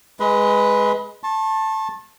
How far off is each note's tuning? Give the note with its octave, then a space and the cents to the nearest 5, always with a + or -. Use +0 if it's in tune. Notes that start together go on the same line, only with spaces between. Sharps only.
G#3 +0 B4 +0 D#5 +35
A5 +0 C#6 -45